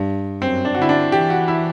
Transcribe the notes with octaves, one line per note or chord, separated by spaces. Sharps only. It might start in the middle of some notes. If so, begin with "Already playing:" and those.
Already playing: G2
F#2 C4
D4
F#4
D3 E4
D4
E3 G4
F#4
E4